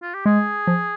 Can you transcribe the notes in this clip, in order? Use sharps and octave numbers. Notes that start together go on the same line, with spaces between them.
F4
G4
G#3 G#4
F3